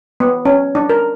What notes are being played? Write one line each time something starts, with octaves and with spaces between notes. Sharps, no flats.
B3
C#4
D4
A#4